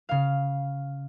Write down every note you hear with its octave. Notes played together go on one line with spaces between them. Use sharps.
C#3 F5